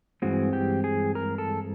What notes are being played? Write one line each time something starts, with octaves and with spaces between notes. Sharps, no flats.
G2 E3 G#3 C4 F#4
G4
G#4
A#4
A4